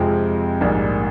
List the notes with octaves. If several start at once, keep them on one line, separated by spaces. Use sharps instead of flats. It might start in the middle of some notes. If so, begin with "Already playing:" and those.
Already playing: F2 C3 F3 G#3 C4
A#1 G#2 G3 A#3